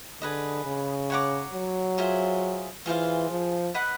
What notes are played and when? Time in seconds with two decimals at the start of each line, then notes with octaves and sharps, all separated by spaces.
0.21 D3 G#4 B4 D#5
0.66 C#3
1.10 C#5 F#5 A#5 D6
1.53 F#3
1.98 F4 G#4 C5 E5
2.86 E3 F4 G#4 C5 F5
3.31 F3
3.74 B4 D#5 F#5 B5